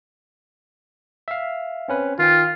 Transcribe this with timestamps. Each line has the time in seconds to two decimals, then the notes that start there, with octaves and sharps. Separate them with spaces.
1.28 E5 F5
1.88 C4 C#4 B4
2.19 D#3 F4 F5 G5